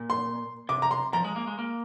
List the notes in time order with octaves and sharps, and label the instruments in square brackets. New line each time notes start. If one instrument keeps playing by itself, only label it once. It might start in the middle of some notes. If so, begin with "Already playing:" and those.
Already playing: [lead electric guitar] A#2
[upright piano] C6
[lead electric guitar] C3 [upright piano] D6
[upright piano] A#5
C6
[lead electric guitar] F3 [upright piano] A#5
[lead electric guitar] G#3
A#3
G#3
A#3